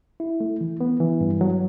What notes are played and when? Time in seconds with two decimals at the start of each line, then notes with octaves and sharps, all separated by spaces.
0.20 E4
0.40 A3
0.61 E3
0.81 B3
1.00 E3
1.20 G2
1.41 F#3